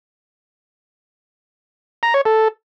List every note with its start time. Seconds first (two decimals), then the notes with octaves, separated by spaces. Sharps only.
2.03 A#5
2.14 C#5
2.25 A4